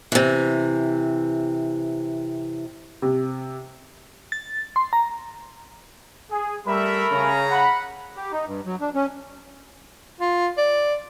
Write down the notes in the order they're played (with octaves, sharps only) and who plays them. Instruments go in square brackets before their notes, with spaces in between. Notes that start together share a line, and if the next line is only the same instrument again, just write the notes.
[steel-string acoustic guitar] C3 E3
[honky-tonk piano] C3
[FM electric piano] A6
C6
A#5
[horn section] G#4
[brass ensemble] G3 E5 [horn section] A3 A#4 B5
[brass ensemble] C#3 C#4 A#5
[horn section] F#5 B5
[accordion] G4
D#4
G2
F#3
D4
C#4
[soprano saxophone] F4
D5